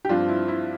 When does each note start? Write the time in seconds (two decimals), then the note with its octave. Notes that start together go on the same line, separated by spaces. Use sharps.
0.05 G4
0.09 G2 F3 C4 D4 F4
0.29 E4
0.48 E4